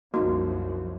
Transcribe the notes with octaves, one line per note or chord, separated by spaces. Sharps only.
C2 F#2 F3 A#3 D#4 F#4